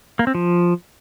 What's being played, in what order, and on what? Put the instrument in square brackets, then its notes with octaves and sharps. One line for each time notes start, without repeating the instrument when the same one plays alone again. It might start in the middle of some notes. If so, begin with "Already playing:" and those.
[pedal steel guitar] A#3
C4
F3